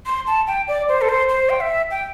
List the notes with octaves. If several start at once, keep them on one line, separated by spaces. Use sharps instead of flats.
C6
A5
G5
D5
C5
A4
C5
C5
G5
E5
G5